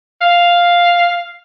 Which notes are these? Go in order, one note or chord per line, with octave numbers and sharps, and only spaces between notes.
F5